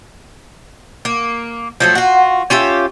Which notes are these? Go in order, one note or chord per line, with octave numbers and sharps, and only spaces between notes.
A#3
F3 F#3 A3
F4 F#4
C#4 F4 G4 E5